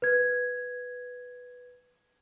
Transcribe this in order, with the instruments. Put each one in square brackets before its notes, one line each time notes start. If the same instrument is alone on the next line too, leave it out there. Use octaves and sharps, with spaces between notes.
[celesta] B4 G#6